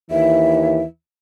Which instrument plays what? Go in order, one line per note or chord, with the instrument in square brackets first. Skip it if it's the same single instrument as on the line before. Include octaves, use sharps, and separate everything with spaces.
[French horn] D#2 [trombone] E3 [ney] E5